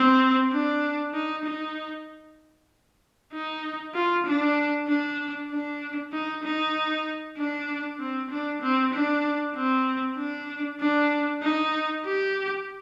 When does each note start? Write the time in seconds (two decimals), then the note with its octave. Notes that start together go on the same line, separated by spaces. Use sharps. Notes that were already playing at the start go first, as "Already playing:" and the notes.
Already playing: C4
0.51 D4
1.14 D#4
1.45 D#4
3.33 D#4
3.94 F4
4.26 D4
4.87 D4
5.50 D4
6.13 D#4
6.43 D#4
7.37 D4
7.99 C4
8.30 D4
8.62 C4
8.94 D4
9.56 C4
10.17 D4
10.80 D4
11.42 D#4
12.05 G4